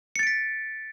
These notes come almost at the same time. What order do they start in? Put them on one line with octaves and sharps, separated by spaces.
C#7 A6 D7 B6